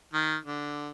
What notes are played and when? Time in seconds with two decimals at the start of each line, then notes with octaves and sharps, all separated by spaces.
0.14 D#3
0.45 D3